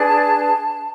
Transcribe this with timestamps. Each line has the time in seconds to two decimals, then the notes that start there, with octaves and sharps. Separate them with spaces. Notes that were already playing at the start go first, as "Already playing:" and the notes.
Already playing: D4 G#4 B4 A5